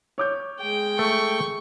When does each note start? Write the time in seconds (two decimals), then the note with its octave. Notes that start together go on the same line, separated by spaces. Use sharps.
0.18 C#5 D6 G6
0.60 G#3 G5
0.99 A3 C#6